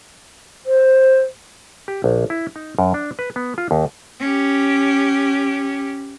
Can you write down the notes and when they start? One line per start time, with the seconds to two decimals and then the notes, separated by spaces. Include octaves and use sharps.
0.66 C5
1.88 G4
2.04 A#1
2.30 E4
2.56 D#4
2.79 F#2
2.94 D4
3.19 B4
3.36 B3
3.58 F4
3.71 D#2
4.20 C#4 G4